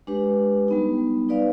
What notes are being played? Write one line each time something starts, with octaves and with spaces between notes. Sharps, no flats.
G#3 D4 G4 B4
G3 B3 D#4
D#4 B4 D5 F5